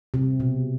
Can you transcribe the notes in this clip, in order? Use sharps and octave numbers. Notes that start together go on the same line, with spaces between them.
C3
B2